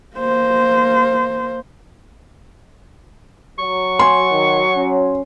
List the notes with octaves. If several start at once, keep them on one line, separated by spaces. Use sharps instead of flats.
A#3 C5
F#3 C#6
G#5 C6
D#3
C#4